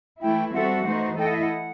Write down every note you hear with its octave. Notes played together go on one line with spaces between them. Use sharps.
E3 A3 E4 G5
G3 C4 F#4 A4 E5 F#5
E3 A3 D#4 F#4 C5
A3 E4 A4 D#5 G5
F#5
E5
F#5